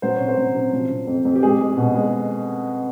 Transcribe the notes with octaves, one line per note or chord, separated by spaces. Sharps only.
F#3 C5
C3 C#5
C5
F#3
C3
F3
C3
F2
F2
G4
G#3 G#4
G#3
B2
G#3